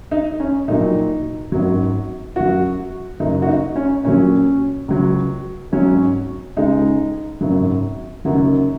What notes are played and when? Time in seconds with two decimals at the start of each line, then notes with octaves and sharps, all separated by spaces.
0.11 D#4
0.40 C#4
0.67 A#1 A#2 F#3 D#4
1.52 G#1 F#2 F#3
2.36 F#2 F#3 F#4
3.20 F#1 F#2 F#3 D#4
3.42 F#4
3.48 D#4
3.76 C#4
4.04 A#1 A#2 F#3 C#4
4.88 C#2 C#3 F#3
5.72 G#1 G#2 F#3 C#4
6.57 C#2 C#3 G#3 D#4
7.41 G#1 F#2 C#3 F#3
8.25 F#1 F#2 D#3 F#3 F#4